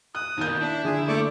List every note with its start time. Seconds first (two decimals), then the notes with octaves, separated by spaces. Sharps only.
0.15 D#6 F#6
0.37 D#2 B2 A#3 G6
0.61 D4 E4
0.84 D3 F3 D4 G#4
1.08 A3 D5 C#6 D6